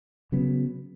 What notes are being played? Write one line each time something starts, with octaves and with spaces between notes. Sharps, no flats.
C#3 F#3 B3